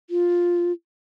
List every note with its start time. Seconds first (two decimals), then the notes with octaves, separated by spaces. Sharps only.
0.10 F4